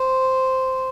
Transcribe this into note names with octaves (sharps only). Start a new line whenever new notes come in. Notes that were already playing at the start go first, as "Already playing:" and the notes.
Already playing: C5